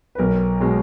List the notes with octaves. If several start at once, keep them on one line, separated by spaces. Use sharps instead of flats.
B4
B1 A#4
B2 G#3